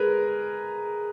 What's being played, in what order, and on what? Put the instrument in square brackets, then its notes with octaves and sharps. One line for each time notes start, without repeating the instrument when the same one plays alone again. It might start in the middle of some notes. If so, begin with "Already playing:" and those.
Already playing: [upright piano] G#3 G#4 A#4 B4